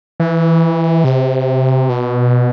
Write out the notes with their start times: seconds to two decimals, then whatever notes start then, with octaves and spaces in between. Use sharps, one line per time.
0.20 E3
1.04 C3
1.89 B2